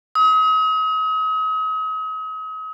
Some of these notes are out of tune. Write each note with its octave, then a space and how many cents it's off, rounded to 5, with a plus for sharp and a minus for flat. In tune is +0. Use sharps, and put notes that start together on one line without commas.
D#6 +40